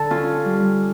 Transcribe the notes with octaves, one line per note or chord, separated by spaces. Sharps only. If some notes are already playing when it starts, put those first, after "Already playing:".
Already playing: D3 A4
C#4 F4
G3